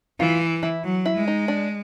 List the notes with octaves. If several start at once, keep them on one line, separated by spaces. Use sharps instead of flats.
E3 F4
E4
F#3
E4
G#3
D#4
D4